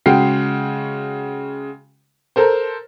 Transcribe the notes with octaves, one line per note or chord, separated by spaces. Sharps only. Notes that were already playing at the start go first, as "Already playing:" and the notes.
C#3 G#3 F#4 G5 C7
A4 A#4 C5